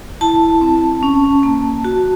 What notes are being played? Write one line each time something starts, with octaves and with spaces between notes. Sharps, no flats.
E4 A5
C4
C#4
A#3
F#4